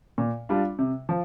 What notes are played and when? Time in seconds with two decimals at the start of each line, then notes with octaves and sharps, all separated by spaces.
0.18 A#2
0.49 G3 D4 F4
0.79 C3
1.09 F3